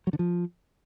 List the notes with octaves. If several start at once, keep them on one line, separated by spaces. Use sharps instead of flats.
F#3
D3
F3